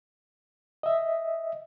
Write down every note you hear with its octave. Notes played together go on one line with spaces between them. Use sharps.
D#5 E5